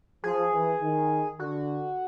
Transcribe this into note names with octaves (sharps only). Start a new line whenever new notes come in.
F3 G#4
E3
D#3
D3 F#4